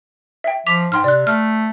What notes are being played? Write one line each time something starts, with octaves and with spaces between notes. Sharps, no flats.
E5 G5
F3 D6 B6 F7
G#2 G5 C6 F6
C3 D5 F#6
A3 F6